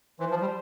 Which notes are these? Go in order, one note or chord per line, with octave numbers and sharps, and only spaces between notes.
E3 C5
F3
G3